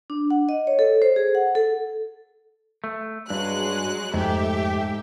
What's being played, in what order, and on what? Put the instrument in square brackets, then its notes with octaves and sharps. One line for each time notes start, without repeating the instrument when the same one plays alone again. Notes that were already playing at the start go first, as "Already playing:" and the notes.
[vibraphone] D4
F#5
D#5
C#5
A4
C5
G#4
F#5
A4
[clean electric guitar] A3
[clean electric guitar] G2 [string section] F#3 G#3 F#6
[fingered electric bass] F2 A3 [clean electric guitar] G#2 [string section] G4 A4 E5